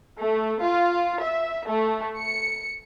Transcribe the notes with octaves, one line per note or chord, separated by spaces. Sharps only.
A3
F4
E5
A3
C#7